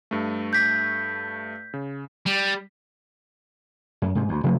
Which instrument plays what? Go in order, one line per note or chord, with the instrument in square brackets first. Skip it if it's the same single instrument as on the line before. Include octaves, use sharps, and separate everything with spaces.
[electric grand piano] G2 A3
[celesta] G6 B6
[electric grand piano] C#3
[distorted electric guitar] G3
[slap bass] F#2
G#2 C3
D2
C3 F3 F#3 A3